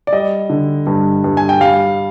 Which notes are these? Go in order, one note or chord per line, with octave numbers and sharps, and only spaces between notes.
D5
G3 D#5
D3
G2
G2
G#5
G5
G3 F5